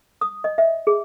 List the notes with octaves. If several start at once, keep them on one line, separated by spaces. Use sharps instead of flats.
D#6
D#5
E5
G#4